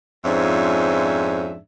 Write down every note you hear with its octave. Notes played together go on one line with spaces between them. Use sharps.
F2 G#2 F3 C#4 D4 E5